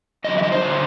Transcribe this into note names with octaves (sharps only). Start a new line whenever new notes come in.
F#2 D3 F#3 D#5
E5
D#5
C5
F#2 D3 F#3